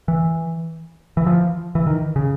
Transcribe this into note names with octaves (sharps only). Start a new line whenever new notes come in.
E3
E3
F3
E3
D#3
C#3